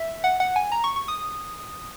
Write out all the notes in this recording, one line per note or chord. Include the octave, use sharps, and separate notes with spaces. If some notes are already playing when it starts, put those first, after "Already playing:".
Already playing: E5
F#5
F#5
G#5
A#5
C#6
C#6
D#6